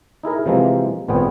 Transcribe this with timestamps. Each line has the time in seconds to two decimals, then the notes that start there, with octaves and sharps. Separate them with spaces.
0.23 D#4 E4 G#4 A#4
0.46 C3 E3 F3 G#3 A#3
1.08 G#1 A#2 B3 G#4 C5 G5